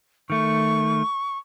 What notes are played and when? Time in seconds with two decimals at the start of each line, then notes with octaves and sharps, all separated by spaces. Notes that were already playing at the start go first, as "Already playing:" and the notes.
0.30 D#3 A3 C#6